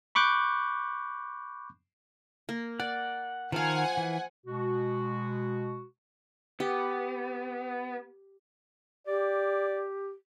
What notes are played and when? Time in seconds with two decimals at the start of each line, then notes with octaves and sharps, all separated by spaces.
0.15 B5 C#6 D6 F#6 G6
2.49 A#3
2.80 D5 F#5
3.52 D#3 F3 A#4 F5 F#5 G#5
3.97 E3
4.46 B2 G#3 F#4
6.60 B3 G4
9.07 G4 D5